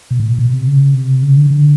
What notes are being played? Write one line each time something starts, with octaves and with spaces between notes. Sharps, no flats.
B2
A2
A#2
B2
C3
C#3
C3
C#3
D3
D3